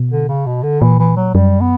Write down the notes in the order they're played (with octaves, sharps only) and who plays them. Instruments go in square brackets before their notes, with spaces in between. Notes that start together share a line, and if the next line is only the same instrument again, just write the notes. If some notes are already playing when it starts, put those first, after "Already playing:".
Already playing: [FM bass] B2
[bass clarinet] D3
C#3
B2
D3
[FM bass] A#2 [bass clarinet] E3
[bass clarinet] E3
F#3
[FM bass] F#2 [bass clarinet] G3
[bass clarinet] B3